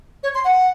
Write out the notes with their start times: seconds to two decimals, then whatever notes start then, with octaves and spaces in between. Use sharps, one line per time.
0.23 C#5
0.35 C6
0.45 F#5